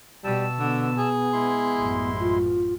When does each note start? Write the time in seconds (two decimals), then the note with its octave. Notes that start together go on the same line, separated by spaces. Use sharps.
0.24 B2 G3 A5 E6
0.59 D3 B3
0.98 G#4
1.33 G#3 E4 C6
1.75 A1 F#2
2.19 F4